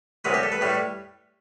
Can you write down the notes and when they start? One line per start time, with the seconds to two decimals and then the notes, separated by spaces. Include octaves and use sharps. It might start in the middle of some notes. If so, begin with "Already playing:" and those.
0.25 C2 C3 F#3 B4
0.34 G4
0.43 A4
0.52 B4
0.61 A2 G3